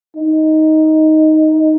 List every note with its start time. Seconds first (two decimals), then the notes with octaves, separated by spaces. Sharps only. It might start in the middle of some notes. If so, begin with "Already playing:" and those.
0.17 D#4